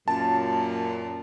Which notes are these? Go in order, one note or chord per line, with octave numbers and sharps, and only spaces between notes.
F#2 A#2 A5